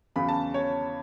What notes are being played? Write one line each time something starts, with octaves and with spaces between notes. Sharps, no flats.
E2 C#3 F#3 B5
A5
C#5